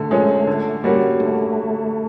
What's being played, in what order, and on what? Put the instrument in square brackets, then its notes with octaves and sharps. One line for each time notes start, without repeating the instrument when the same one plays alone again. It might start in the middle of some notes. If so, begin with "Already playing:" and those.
Already playing: [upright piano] D3 [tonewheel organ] A3
[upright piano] F3 G#3 C#4
D3
G3 A#3 C#4 F#4
[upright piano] D3 [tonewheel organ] A3